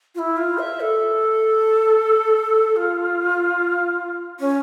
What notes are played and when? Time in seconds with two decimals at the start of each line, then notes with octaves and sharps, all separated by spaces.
0.15 F4
0.19 E4
0.37 F4
0.59 E5
0.80 A4
2.76 F4
4.40 C#4